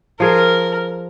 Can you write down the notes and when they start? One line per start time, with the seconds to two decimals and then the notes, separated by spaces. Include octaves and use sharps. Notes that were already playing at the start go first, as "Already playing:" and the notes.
0.20 F3 G#4 A#4